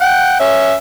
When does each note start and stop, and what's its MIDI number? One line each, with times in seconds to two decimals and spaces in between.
0.01 0.38 78
0.01 0.38 79
0.40 0.75 61
0.40 0.75 76